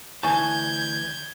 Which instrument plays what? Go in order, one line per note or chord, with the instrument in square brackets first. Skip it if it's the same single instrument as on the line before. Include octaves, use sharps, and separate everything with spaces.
[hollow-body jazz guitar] D2 E3 A5 [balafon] G#5 C#6 [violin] G6 G#6